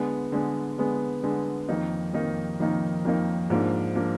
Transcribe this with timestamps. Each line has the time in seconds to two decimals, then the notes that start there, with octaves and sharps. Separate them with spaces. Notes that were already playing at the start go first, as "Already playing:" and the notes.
Already playing: D3 G#3 B3
0.32 D3 G#3 B3
0.78 D3 G#3 B3
1.23 D3 G#3 B3
1.68 F2 D#3 A#3 D#4
2.13 F2 D#3 A#3 D#4
2.60 F2 D#3 A#3 D#4
3.05 F2 D#3 A#3 D#4
3.50 G#2 F3 A#3 D4
3.96 F3 A#3 D4